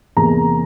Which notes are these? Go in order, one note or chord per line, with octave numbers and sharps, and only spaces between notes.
E2 C3 E3 A#3 A#5